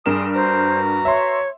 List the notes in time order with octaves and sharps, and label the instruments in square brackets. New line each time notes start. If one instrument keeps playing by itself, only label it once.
[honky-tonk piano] G2 A#4 E7 [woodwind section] G#4 C6 D#6
[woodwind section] F#4 B4 A#5 [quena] C5
[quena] C#5 [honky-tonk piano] E5 C6